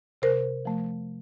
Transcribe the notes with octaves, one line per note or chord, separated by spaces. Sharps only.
C3 A#4 C5
F3 A3